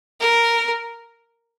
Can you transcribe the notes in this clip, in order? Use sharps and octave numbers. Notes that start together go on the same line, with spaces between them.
A#4